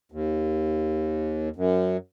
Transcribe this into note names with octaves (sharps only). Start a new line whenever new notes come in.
D#2
F#2